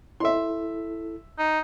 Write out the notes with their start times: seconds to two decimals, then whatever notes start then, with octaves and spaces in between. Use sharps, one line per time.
0.20 E4 A4 E5 C6
1.39 D#4